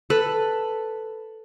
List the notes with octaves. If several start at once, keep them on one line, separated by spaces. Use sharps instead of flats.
A4 B4 B5